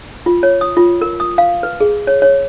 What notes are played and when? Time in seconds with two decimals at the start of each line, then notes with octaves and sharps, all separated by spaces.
0.26 F4
0.43 C#5
0.61 D#6
0.77 F4
1.01 A#4
1.20 D#6
1.38 F5
1.63 B4
1.81 G#4
2.07 C#5
2.22 C#5